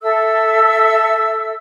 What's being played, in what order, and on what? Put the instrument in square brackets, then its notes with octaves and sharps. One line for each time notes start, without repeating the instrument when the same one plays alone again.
[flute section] A4 E5 E6